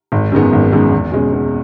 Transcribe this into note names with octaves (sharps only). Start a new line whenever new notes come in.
G#1
F#2 D#3 G#3 B3
G#1
F#2 D#3 G#3 B3
E2
B2 G#3 C#4
E2